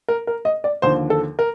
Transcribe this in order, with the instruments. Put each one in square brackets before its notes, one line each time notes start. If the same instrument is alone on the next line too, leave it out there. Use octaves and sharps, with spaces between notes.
[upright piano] A#4
A#4
D#5
D5
D#2 D3 F3 C5
A4
A#4